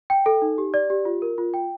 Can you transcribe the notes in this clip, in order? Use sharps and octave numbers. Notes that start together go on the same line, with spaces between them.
G5
A4
D#4
G4
D5
G4
F4
A#4
F4
G5